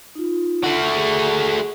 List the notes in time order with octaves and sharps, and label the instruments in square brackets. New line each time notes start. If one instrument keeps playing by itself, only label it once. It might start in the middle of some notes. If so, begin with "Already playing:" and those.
[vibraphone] D#4 F4
[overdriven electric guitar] A3 F#4
[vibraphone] G#4